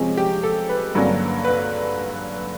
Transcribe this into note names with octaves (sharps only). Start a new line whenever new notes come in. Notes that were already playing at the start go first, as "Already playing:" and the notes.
Already playing: C3 F3 G#3 C#4
G4
A4
B4
G2 D3 F#3 A#3 C#4
B4